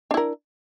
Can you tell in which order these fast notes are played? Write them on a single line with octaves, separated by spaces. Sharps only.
D4 E4 A#4